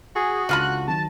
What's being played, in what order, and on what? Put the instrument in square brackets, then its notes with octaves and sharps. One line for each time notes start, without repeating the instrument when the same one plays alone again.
[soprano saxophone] F#4 [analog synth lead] G#4
[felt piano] C#2 A#6 D#7 [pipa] D3 F4 B5 [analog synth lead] F#6
[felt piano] D#3 F#3 [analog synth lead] A5